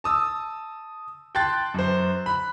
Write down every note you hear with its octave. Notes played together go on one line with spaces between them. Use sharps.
A5 D#6 E6
G5 A5 C6 F#6 A6
F#2 C5
B5 F#6